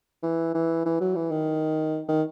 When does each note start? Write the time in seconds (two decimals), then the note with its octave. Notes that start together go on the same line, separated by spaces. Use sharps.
0.23 E3
0.54 E3
0.86 E3
1.01 F#3
1.15 E3
1.32 D#3
2.09 D#3